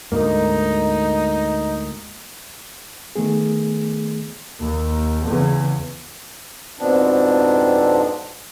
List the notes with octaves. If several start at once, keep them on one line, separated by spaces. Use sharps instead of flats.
D2 G#2 A#3 D#4
D#3 A3 B3 G#4
D#2
E2 C#3
F2 G#2 B2 B3 C4 D4